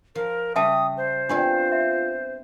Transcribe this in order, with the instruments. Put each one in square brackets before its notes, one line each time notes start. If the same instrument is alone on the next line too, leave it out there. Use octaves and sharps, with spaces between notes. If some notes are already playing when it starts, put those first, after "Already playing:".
[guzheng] F3 [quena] A#4
[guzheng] C#3 G3 [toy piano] E5 G5 A5 [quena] D#6
[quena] C5
[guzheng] B3 C4 A4 [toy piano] D4 G4 D5 [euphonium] F4
[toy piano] E5